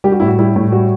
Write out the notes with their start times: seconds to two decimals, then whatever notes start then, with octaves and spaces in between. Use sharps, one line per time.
0.04 G3 G4
0.12 F#4
0.20 A2 E4
0.27 F#4
0.39 G3 E4
0.56 A2
0.72 G3 F#4